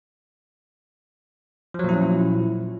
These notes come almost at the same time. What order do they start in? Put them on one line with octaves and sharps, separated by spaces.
F3 F#3 A#2 E4 C#4